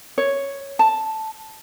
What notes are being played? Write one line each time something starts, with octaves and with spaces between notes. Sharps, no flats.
C#5
A5